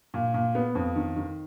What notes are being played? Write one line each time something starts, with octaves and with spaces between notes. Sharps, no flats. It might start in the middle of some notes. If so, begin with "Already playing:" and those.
A#2
A#2
B3
F2
D#3
D#3